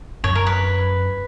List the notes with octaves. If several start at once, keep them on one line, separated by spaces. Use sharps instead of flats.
F#2 C#5
A#4
B4